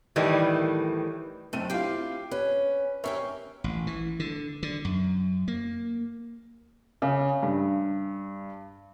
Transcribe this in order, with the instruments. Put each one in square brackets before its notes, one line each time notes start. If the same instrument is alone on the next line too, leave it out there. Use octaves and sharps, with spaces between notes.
[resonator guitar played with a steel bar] A2 D#3 E3 G3
[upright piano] F#1 C4 D#7 [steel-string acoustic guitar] A3
[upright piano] C4 E4 F4 [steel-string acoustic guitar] G4 F5
[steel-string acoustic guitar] C#4 [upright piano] B4
[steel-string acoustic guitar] C4 C#4 G4 [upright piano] A#4 C#5 E5
[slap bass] A1
E3
D3
D3
F#2
A#3
[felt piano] C#3
G2